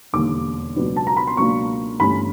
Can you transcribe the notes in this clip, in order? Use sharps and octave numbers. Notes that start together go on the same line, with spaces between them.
E1 D#2 D3 G3 A#3 D6
C#2 B2 F#3 B3 D4
A5
A#5
B5
C6
C#2 B2 F#3 A#3 D4 C#6
G1 G2 E3 A3 C#4 B5